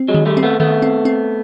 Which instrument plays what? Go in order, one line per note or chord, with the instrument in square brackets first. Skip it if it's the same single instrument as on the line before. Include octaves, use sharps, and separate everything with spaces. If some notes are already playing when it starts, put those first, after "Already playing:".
Already playing: [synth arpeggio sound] C4
[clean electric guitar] F#3 G#3
[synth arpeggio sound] D#3
[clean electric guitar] G3 A3
[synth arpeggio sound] C4
[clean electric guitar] A3 B3
[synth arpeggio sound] D#3 [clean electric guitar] A3 B3
[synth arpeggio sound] C4
C4